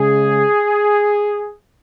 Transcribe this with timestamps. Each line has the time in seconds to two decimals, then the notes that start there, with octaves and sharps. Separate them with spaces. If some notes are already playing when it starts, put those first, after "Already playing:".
Already playing: C#3 G#3 G#4